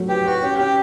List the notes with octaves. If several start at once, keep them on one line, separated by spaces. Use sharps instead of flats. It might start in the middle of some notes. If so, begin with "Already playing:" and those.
Already playing: F#3 A3
G4 B4
F#4 B4
C#4 G4
C#4 G4